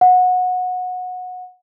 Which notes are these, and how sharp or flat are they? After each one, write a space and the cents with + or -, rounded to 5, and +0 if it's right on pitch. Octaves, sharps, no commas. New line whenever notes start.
F#5 -20